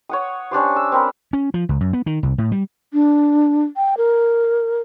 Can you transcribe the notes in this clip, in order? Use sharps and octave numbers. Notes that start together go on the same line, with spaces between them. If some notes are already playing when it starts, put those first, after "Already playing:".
C#5 F#5 D#6
C#4 D4 G4 C5
E6
C4 A#4 B5
C#4
F3
C#2
F#2
B3
D#3
C2
A2
G3
D4
G5
A#4